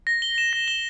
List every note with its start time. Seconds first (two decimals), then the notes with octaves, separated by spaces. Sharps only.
0.07 A#6
0.22 G7
0.38 E7
0.53 A#6
0.68 G7